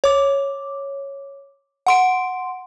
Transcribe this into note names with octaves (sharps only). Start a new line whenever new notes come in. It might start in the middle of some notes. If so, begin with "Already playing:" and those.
C#5 D6
F#5 C6 D7